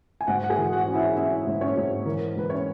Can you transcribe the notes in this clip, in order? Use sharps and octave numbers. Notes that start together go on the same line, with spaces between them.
G#5
G#2 F#4 F#5
F#5
G#4 G#5
E3
F#4 F#5
C#4
E4 E5
C#4 E4 E5
G#2
C#4 C#5
G#2
E3 A#4
G#2 B4
C#4 C#5